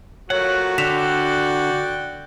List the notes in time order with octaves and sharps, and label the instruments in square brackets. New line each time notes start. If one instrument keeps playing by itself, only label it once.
[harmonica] F3 A3 A#3 [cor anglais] F#4 [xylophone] C#5 [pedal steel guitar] F#5
[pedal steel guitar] D3 [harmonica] D5 F#5 G5 [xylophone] B6 E7 F7